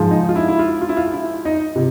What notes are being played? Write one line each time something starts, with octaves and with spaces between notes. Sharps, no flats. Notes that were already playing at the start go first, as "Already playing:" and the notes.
Already playing: G#2 F3 G#3
D#4
F4
E4
E4
F4
F4
E4
F4
E4
D#4
C3